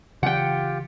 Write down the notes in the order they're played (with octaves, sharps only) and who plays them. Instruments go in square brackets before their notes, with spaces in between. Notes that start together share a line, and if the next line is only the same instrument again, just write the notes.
[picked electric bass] C#3 E3 F#3 [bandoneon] F4 G4 [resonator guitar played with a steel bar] F#5 G5